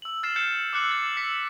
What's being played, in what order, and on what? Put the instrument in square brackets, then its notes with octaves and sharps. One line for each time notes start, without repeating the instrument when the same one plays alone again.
[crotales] E6 F#7
F6 A6 C7 E7
G6 A6 C#7 E7
D6 E6 F#6 C#7 F#7
F#6 A6 F#7
E6 B6 C#7